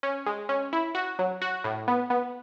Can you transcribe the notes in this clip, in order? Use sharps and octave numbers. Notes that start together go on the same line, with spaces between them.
C#4
G#3
C#4
E4
F#4
F#3
F#4
A2
B3
B3